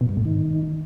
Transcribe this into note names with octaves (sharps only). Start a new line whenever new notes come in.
B2
G2
A2
D#3